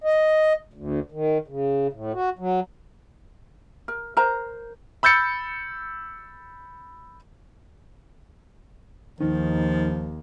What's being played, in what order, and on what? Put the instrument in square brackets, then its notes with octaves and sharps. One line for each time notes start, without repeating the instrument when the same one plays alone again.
[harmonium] D#5
D2
D#3
C#3
A2
F#4
F#3
[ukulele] A#4
A#4 C5 A#5
[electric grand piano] B5 E6 G6 A6 C#7
[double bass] D#2 [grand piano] D#3 [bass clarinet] F3 [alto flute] D#4